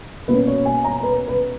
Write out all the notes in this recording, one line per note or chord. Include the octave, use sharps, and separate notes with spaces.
B2 A#3 C#4 B4
C#5
G#5
A#5
B4
B4